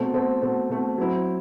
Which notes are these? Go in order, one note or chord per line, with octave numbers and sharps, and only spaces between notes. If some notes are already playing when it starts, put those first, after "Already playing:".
Already playing: B2 A3 C4
B2 A3 C4
B2 A3 C4
B2 A3 C4
F#3 C4 E4